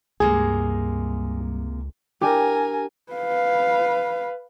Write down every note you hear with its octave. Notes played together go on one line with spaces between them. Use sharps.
C#2 G2 C3 G#3 A#3 G#4
D4 G4 A#4 G#5
B4 F5